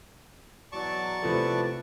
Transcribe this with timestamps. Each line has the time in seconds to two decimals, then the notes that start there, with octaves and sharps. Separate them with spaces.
0.72 E2 B2 F#3 D5 A5 C#6
1.22 C3 F3 A3 B3 E4 B4